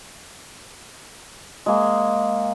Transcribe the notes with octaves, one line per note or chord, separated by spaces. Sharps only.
G#3 A#3